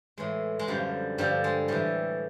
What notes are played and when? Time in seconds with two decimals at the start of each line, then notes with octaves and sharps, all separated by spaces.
0.17 A2 E3 G#3
0.59 G#3
0.67 F#2 D3 F3 G3
1.18 G2 D3 F3 G3
1.44 G#3
1.68 A2 E3 G3